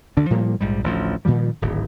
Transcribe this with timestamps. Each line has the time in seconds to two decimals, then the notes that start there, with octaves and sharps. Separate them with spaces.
0.17 D2 D3 D4
0.30 A2 F3 G3 A#3
0.61 A#1 G#2 G3
0.84 A1 D2 F3
1.25 A#2 D#3 F3 G3
1.61 D1 G#1